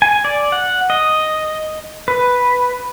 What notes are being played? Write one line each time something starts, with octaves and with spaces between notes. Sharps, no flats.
G#5
D5
F#5
D#5
B4